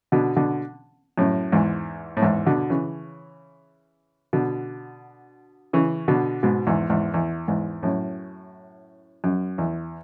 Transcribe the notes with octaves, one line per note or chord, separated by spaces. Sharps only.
B2 D3
B2 D3
F#2 A2
E2 G#2
A2
E2 G#2
B2 D3
C#3 E3
B2 D3
C#3 E3
B2 D3
G#2 B2
E2 G#2
E2 G#2
E2
E2 G#2
F#2 A2
F#2
E2